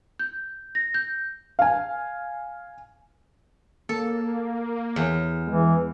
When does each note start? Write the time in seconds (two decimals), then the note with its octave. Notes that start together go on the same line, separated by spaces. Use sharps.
0.19 G6
0.75 A#6
0.94 G6
1.59 F5 G#5
3.89 A#3 A4
4.96 E2
5.47 E3 G#3